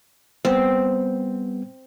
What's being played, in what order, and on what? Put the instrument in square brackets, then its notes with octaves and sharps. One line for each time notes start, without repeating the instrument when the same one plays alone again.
[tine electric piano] G3 B3 [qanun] C4